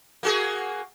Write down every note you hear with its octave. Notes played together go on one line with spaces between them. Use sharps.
A#3 F#4 G#4